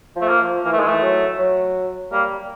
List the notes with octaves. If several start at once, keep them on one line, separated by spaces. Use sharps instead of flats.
F3
A3
A#3
F3
E3 A#3
A3
D#3 G#3
E3 A3
F#3
F#3
G3 A#3